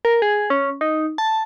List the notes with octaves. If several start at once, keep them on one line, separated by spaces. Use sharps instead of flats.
A#4
G#4
C#4
D#4
A5